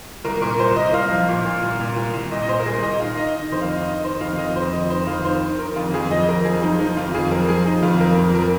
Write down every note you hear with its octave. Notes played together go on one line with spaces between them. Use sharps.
C2 A#4
A#2 A#4
C2 C5
C2 D#5
C2 F5
F3
A#2
A#2
C2
A#2
C2
C2
A#2 D#5
D#5
A#2 C5
A#4
C2 G#4
A#2 D#5
D#3 F5
D#3 D#5
D#3
F2 C5
F5
D#3 D#5
D#3 D#5
D#3 C5
F2 F5
F2 D#5
F2 C5
F2 D#5
D#3 C5
F2 F5
D#3 C5
D#3
D#3 A#4
F2 F4
F2 G#4
F3 D#5
F2 A#4
F3 G#4
F3 D#4
F3 D#4
F2 F4
F2 G#4
F3 A#4
F3 G#4
F3 D#4
F2 F4
F3 A#4
F2
F3 A#4